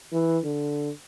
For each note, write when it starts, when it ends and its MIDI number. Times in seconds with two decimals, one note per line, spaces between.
0.12 0.39 52
0.44 0.90 50